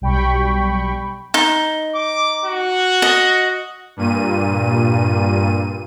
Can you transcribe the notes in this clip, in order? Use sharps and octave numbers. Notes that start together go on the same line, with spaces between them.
B1 G3 G5 B5 C#6
D#4
D6
F#4
D#5
G2 A#2 D#7